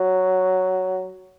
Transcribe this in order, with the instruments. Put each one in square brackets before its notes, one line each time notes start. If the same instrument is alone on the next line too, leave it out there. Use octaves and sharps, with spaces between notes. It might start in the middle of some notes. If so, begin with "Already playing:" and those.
Already playing: [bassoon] F#3